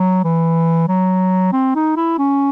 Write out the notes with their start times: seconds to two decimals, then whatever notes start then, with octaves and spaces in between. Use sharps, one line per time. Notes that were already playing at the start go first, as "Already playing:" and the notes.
Already playing: F#3
0.24 E3
0.88 F#3
1.52 C4
1.75 D#4
1.97 E4
2.18 C#4